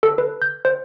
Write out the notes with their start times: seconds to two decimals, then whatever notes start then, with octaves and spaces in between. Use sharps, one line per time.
0.03 A4
0.18 B4
0.42 G6
0.65 C5